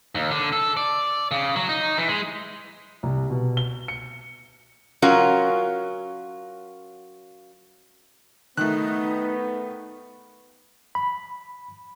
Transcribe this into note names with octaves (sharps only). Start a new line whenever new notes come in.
D#2
D3
A4
D5
C#3
F#3
D#4
E3
G#3
C2
B2
G7
C#7
F#3 C#4 F4 F#4 A#4
D#3 A3 B3 D#4 F#6
B5